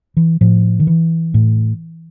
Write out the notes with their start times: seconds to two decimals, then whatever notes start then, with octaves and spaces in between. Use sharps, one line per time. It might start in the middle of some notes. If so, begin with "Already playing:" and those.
0.17 E3
0.41 A2 F3
0.80 D#3
0.87 E3
1.34 A2